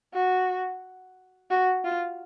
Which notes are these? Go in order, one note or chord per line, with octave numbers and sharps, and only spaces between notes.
F#4
F#4
F4